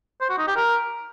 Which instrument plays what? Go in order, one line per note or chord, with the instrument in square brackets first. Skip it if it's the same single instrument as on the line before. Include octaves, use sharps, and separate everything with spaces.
[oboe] C5
F#4
D#4
G4
A#4